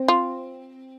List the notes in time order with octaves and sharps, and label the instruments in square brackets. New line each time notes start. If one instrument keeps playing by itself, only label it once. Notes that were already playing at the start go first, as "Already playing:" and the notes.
Already playing: [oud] C4
[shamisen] F4